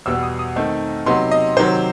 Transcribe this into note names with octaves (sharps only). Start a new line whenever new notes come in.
E2 B2 G3 B3 E6
D#6
D#6
D#3 A3 C4 D#4
C3 F#3 B3 D#4 C6
D#5
C3 D#3 F#3 C5